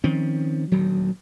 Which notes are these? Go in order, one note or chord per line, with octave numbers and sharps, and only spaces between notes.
D#3 F3 C4 C#4
D#1 D2 D#3 F#3